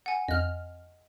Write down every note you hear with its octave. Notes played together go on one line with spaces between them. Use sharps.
F#5 G#5
F2 D#5 F6